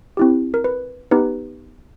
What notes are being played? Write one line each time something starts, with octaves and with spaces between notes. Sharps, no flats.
C4 E4 G4
A#4
B4
B3 D#4 G4 B4